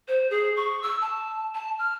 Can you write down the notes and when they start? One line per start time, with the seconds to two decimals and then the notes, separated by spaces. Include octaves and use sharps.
0.08 C5
0.30 G#4
0.56 C#6
0.83 E6
1.01 A5
1.55 A5
1.79 F6